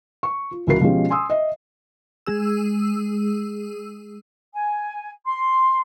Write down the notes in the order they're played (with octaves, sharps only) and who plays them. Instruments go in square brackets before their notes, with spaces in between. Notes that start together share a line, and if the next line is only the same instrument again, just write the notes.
[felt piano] C#6
F4
C#2 E3 E4 F#4 A#4 C7
B2 F3 G#3 C#4 G4
G#5 C6 D#6 E6
D#5 E5
[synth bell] G#3 G#4 E6
[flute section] G#5
C6